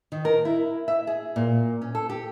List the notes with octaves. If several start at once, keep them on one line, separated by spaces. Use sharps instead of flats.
D#3
A#4
E4
E5
G#4
A#2
C#4
A4
G4